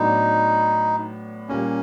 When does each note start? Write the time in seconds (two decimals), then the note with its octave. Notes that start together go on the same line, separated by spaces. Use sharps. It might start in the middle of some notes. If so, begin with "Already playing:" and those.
Already playing: A2 F#3 B3 D4 D#4
1.49 A#2 G3 A#3 C#4